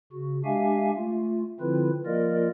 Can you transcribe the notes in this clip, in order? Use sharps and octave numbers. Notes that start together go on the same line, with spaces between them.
C#3 F#4
G#3 D4 G4 E5 F5 G#5
A3 F4
D3 F3 C4 E4 F4 B4
F3 A#3 F4 A#4 D5 D#5